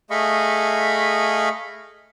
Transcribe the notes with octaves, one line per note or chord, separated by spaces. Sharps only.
A3 G#4 D#5 F5 B5 C#6